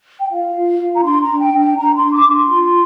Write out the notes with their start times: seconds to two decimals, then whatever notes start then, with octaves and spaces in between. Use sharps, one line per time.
0.20 G5
0.30 F4 F5
0.55 F4
0.79 F4
0.96 A#5
1.04 D4 C6
1.23 A#5
1.28 D4
1.40 G5
1.52 D4
1.58 G5
1.77 D4 A#5
1.95 C6
2.01 D4
2.14 D6
2.26 D4
2.32 C6
2.50 F4